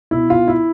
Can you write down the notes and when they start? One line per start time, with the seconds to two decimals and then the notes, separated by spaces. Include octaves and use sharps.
0.11 B2 E4
0.29 B2 F4
0.48 E4